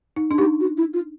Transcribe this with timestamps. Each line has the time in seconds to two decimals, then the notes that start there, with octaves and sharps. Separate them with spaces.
0.16 D#4
0.31 D4
0.38 D#4 G4
0.60 F#4
0.77 E4
0.94 F4